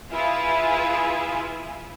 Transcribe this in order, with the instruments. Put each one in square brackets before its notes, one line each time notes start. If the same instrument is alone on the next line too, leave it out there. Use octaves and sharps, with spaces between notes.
[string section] E4 F4 G#4 B4 E5